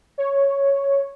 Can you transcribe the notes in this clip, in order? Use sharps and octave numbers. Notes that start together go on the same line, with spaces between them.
C#5